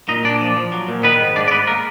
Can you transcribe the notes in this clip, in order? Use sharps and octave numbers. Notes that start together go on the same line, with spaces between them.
A#2 D#4 D#5
A#2 D4 D5
F3
F3
F#3
A#2
D#3 B3 B4
G#2
G#2 D4 D5
D5
G#2 B3 B4
A#3 A#4